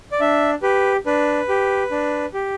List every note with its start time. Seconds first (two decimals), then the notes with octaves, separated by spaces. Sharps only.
0.12 D5
0.20 D4 E5
0.63 G4 B4
1.06 D4 B4
1.49 G4
1.91 D4
2.34 G4